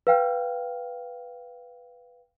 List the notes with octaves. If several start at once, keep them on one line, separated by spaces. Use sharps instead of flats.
B4 F5 G5 F6